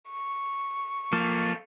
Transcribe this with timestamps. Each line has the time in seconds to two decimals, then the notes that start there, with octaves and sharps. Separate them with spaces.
0.10 C#6
1.13 F3 A#3 A4 F5